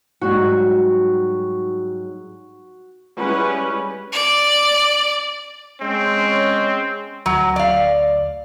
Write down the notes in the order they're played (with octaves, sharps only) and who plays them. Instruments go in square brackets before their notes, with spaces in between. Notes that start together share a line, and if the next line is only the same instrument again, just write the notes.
[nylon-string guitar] G#2 F#3 G3 [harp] F#4
[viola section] G3 G#3 C#4 E4 B4 F#5
[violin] D5
[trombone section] G#3 C#4 [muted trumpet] C4
[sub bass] D2 [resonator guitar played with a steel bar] F#3
[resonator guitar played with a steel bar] D5 F5